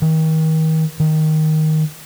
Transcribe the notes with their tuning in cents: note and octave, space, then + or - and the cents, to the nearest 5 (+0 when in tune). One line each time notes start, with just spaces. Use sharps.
D#3 +35
D#3 +5